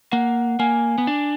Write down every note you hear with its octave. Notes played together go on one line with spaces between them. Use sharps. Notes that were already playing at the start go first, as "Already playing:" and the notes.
A#3 F#5
A#3 G#5
B3
D4